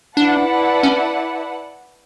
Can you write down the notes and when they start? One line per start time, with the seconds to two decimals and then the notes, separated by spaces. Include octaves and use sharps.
0.17 D4 E4 B4 D5 F#5 A5
0.83 C#4